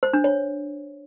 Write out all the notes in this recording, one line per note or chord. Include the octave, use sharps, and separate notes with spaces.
C5
D4
C#5